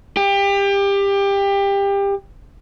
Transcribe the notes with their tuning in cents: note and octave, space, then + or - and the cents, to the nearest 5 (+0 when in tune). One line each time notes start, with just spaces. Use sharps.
G4 +25